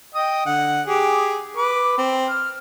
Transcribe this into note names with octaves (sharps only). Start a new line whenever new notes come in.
D#5 G5 D#6
D3 F#5
G4 G#4
B4 D6
C4
F6